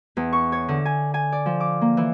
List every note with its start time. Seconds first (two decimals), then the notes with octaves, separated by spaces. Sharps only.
0.17 E2
0.33 C#6
0.52 C#5
0.68 D3
0.85 G#5
1.14 G#5
1.32 D5
1.46 F3
1.60 D6
1.81 A#3
1.97 E3